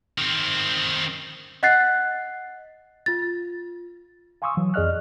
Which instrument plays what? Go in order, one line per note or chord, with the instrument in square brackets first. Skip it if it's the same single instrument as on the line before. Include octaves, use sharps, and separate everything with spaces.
[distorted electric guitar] D#3 C4
[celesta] D#5 F#5 F#6 A6 C7
F4 A6
[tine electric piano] F5 G#5 C6 C#6 D#6 E6
E3 F#3
F2 G#4 D5 D#5 F6 F#6